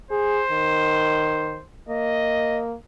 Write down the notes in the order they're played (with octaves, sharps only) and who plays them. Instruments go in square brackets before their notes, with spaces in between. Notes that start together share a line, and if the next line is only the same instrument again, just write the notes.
[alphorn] G#4 [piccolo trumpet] C5
[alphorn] D#3
[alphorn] A#3 [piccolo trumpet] D#5